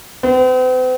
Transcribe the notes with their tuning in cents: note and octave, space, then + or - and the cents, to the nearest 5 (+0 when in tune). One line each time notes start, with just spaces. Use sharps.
C4 -45